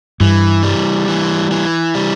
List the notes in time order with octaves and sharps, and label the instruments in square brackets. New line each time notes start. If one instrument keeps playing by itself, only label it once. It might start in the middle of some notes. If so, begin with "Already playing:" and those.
[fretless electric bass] G2 [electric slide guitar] E3
[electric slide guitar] G3
E3
E3
G3